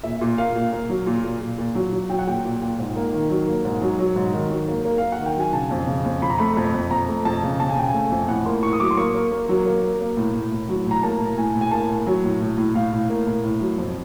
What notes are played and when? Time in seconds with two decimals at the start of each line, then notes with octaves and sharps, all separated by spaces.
0.03 A#2 E5
0.21 A#2
0.38 A#3 F5
0.55 A#2
0.72 A#3
0.89 F#3
1.06 A#2
1.24 A#2
1.41 A#2
1.58 A#2
1.75 F#3
1.92 F#3
2.10 F#3 G5
2.19 F#5
2.27 A#2 G5
2.45 A#2
2.62 A#2
2.79 G#2
2.96 A#3
3.13 D#3
3.30 F#3
3.47 A#3
3.65 G#2
3.82 F#3
3.99 F#3
4.16 G#2
4.33 D#3
4.50 F#3
4.68 A#3
4.85 A#3
4.98 A#3 F5
5.12 F#5
5.19 D#3
5.26 G5
5.36 F#3 G#5
5.53 C#3 A5
5.71 F2
5.88 C#3
6.05 F2
6.22 F2 B5
6.30 A#5
6.38 A3 B5
6.57 F2
6.74 F2
6.91 F2 A#5
7.08 A3
7.25 F2 A5
7.43 C#3
7.59 C#3 A5
7.69 G#5
7.76 C#3 G5
7.88 G#5
7.94 A3
8.11 F2
8.28 A2 F#5
8.46 A#3 C6
8.63 A2 C#6
8.73 D#6
8.80 F#3 D6
8.91 C6
8.97 A#3 C#6
9.14 A#3
9.31 A#3
9.49 F#3
9.66 A#3
9.82 A#3
10.01 A#3
10.17 A2
10.34 A2
10.52 A2
10.69 F#3
10.86 A2 A#5
11.03 A#3 A5
11.20 A2
11.37 A2 G#5
11.55 A2
11.61 G#5
11.72 A#3 A5
11.89 A2
12.07 F#3
12.24 A2
12.41 A2
12.58 A2
12.75 A2 F5
12.93 A2
13.10 A#3
13.27 A2
13.44 A2
13.61 F#3
13.78 F2